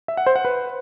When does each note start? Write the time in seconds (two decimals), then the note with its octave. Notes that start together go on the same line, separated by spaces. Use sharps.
0.08 E5
0.17 F#5
0.26 C5
0.36 F#5
0.45 B4